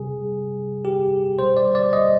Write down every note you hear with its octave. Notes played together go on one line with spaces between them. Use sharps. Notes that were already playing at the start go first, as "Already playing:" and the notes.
Already playing: C3 G3 G#4
G4
B2 G3 C5
D5
D5
D#5